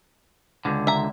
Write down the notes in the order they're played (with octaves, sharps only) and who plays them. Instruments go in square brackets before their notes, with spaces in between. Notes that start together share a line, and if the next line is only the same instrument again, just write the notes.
[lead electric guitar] C#2 D3
[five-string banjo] E5 A#5